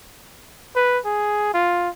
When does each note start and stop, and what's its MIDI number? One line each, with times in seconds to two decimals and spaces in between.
0.76 0.98 71
1.05 1.54 68
1.54 1.89 65